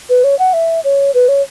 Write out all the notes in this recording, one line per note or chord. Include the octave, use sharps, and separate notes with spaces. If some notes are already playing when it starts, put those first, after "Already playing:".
B4
C#5
F#5
E5
C#5
B4
C#5